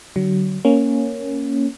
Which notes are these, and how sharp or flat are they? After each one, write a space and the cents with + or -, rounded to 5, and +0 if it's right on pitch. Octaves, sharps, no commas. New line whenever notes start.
D3 +0 F#3 +30
A#3 +0 C#4 +0